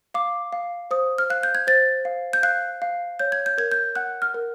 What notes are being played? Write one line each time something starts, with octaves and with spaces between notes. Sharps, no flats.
F5 D6
F5
C5 D#6
F6
F5 F#6
G6
G#6
C5 A6
F5
G6
F5 F#6
F5
C#5 G6
G#6
G6
A#4 G#6
G6
F#5 F#6
F6
A#4